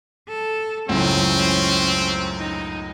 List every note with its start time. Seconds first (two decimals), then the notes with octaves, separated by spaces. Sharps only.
0.29 A4
0.89 C#2 F#2 A2 C4 C#4
2.39 D#4